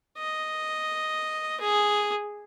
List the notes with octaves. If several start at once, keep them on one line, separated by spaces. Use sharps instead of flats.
D#5
G#4